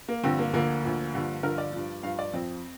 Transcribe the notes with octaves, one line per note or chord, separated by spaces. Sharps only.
A#3
G2 D3 F3 C4
A#3
D2 D3 F3 A#3
D2 D3 F3
G2 D3 F3
G2 D3 F3 A#4
D5
G2 F3
G2 F3 F5
D5
F2 F3 C4